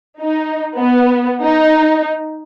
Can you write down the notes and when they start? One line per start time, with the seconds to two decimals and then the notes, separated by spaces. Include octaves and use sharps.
0.20 D#4
0.78 B3
1.41 D#4